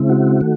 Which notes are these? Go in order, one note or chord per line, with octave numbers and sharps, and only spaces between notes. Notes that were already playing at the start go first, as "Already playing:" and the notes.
Already playing: C#3 G#3 C4 E4
F#4
D#3 A3